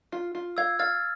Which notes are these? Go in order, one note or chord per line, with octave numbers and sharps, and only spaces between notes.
F4
F4
F5 E6 G#6
F5 F6 A6